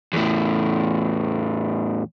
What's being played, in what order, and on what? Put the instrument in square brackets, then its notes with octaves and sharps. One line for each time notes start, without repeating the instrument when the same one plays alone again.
[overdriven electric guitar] E2 A2